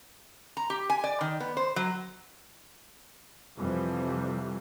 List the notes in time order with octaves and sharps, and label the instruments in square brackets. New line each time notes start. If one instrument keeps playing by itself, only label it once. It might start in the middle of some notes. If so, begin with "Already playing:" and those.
[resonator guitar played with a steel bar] A#5
G4
G#5
D5
D#3
B3
C5
F#3
[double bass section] F2 C3 E3 F3 G3